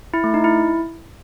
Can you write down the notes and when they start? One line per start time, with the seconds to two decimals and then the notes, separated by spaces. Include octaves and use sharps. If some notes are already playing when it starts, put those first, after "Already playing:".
0.14 E4
0.24 A3
0.34 D#4
0.44 E4